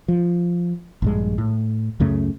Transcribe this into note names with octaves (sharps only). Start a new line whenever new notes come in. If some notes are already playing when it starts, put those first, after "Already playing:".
F3
A#1 G2 G#3
A2
C#2 F#2 C#3 A3